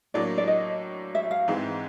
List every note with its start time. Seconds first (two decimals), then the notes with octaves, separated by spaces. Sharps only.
0.14 A2 F#3 A#3 D4 D5
0.38 D5
0.47 D#5
1.15 E5
1.31 F5
1.48 G#2 E3 G#3 C4